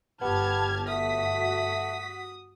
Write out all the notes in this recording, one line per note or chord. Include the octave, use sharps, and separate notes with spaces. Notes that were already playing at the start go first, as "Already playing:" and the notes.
G1 B3 G4 A5 F6 G#6
A3 F#4 D#6 B6